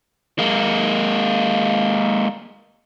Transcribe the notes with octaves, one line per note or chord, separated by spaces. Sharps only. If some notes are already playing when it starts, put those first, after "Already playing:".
G#3 A#3